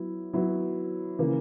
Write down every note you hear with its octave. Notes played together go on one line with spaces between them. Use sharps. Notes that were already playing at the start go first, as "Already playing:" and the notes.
Already playing: F#3 B3 E4
F#3 B3 E4
C#3 E3 A#3